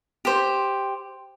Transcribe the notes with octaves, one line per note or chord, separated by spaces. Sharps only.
G4 C5